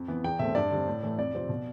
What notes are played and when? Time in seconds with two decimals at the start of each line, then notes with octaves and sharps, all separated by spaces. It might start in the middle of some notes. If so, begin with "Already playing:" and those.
Already playing: F2
0.08 E3 B3
0.24 E2 G5
0.39 B2 A3 C4 E5
0.55 G2 D5
0.71 D3 G3 C4
0.87 A2
1.03 E3 A3
1.18 F2 D5
1.34 C3 F3 C4
1.49 B2